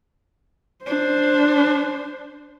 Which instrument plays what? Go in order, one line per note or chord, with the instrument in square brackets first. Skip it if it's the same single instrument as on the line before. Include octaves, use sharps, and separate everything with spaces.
[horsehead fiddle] D4 C5